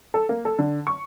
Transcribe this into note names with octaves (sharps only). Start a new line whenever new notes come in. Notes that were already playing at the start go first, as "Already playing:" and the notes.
A4
A#3
A4
D3
C#6